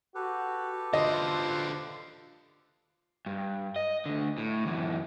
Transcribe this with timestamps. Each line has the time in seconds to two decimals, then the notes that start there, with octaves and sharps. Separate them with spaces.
0.15 F#4 G4 A4 B4
0.93 D3 F4 C5 D#5
3.26 G2
3.76 D#5
4.06 D2 D3
4.38 A2
4.66 F#2 E3